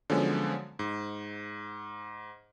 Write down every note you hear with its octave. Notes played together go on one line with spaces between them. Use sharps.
D3 F3 F#3 G#3 B3 C#4
G#2